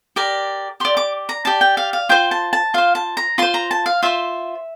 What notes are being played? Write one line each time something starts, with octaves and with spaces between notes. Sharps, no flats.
G4 A#4 D5
G4 D5 C6
D6
A#5
G4 D5 A5
G5
F5
F5
F4 C5 G5
A5
A5
F4 C5 F5
A5
A#5
F4 C5 C6
A#5
A5
F5
F4 C5 E5